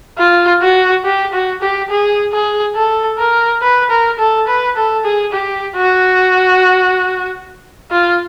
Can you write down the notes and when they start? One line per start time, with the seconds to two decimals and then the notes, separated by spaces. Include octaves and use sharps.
0.18 F4
0.62 F#4
1.05 G4
1.33 F#4
1.62 G4
1.90 G#4
2.33 G#4
2.76 A4
3.19 A#4
3.62 B4
3.90 A#4
4.19 A4
4.48 B4
4.76 A4
5.05 G#4
5.33 G4
5.76 F#4
7.91 F4